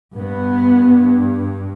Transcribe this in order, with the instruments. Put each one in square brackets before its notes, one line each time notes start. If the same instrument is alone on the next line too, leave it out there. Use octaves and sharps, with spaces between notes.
[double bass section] G2 B3